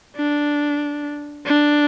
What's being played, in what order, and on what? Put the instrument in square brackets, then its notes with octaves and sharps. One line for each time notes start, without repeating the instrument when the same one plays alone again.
[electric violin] D4
D4